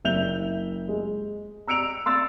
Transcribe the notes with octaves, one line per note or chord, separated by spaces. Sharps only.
F#1 E5 G6 F7 G7
G#3
A#5 E6 C#7 D7 F7
C6 E6 A6